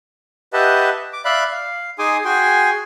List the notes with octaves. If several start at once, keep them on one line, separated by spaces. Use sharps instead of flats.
G4 B4 D#5 E5 F#5 A5
D6
D5 E5 F5 B5 F#6
F5
D#4 G#4 G#5 C6 D6 D#6
F#4 G#4 G5 G#5 C6